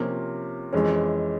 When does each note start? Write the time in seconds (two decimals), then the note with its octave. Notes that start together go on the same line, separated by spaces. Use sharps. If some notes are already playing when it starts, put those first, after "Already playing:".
Already playing: C3 F3 A#3 C#4
0.73 F2 E3 G#3 C#4